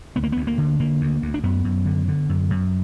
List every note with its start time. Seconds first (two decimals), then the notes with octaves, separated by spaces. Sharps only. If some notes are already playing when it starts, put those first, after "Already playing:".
0.16 D2 B3
0.23 A#3
0.32 D2 B3
0.47 A#3
0.58 D3
0.80 D3 A#3
1.01 D2
1.22 D2
1.34 D4
1.43 F#2 B3
1.64 F#2
1.86 D3
2.08 D3
2.29 F#2
2.50 F#2